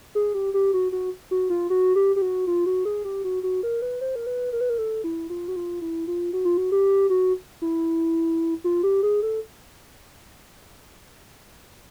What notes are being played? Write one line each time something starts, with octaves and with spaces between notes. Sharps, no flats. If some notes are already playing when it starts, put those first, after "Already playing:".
G#4
G4
G4
F#4
F#4
F#4
F4
F#4
G4
G4
F#4
F4
F#4
G#4
G4
F#4
F#4
A#4
B4
C5
A#4
B4
A#4
B4
A#4
A4
E4
F4
F#4
F4
E4
F4
F#4
F4
F#4
G4
F#4
E4
F4
G4
G#4
A4